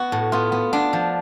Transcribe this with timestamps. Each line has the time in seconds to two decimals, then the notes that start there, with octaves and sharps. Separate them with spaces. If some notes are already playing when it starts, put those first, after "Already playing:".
Already playing: B3 F#4
0.12 A2
0.32 B3 F4
0.52 B3
0.73 B3 D4
0.93 F3